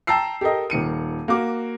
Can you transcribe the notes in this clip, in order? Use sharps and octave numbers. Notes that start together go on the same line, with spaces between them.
G5 A5 A#5 E6 C7
G4 A4 A#4 D#5
D#1 D#3 C#7 D#7
A#3 F#4 D6